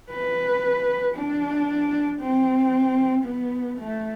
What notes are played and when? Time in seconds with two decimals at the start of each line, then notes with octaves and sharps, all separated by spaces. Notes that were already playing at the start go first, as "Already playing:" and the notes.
0.11 B4
1.15 D4
2.20 C4
3.25 B3
3.78 A3